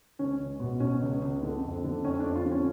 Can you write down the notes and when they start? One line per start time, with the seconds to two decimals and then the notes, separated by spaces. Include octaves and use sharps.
0.19 C#2 C#4
0.40 C#2
0.60 B2
0.80 B2 C#4
1.02 C#2
1.22 C#2
1.43 D3
1.63 F2
1.84 D3
2.04 F2 C#4
2.20 D4
2.25 F2
2.36 F4
2.46 D3
2.51 C#4